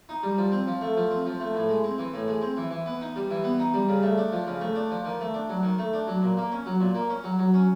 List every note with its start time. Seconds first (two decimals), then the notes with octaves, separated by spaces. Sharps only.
0.09 D#4
0.23 G3
0.38 F3
0.52 C4
0.67 F3
0.81 A3
0.97 F3
1.11 C4
1.25 F3
1.40 A3
1.55 A2
1.69 G#3
1.84 C4
1.98 E3
2.14 A2
2.28 G#3
2.42 C4
2.57 E3
2.71 E3
2.86 B3
3.01 D#4
3.16 G3
3.30 E3
3.44 B3
3.59 D#4
3.74 G3
3.89 C#3
4.03 A3
4.18 D4
4.32 F3
4.47 C#3
4.61 A3
4.75 D4
4.91 F3
5.05 D#3
5.20 A3
5.34 D4
5.49 F#3
5.63 D#3
5.78 A3
5.93 D4
6.07 F#3
6.22 A#2
6.37 A#3
6.52 C#4
6.66 F#3
6.80 A#2
6.95 A#3
7.10 C#4
7.24 F#3
7.39 F#3
7.54 C#4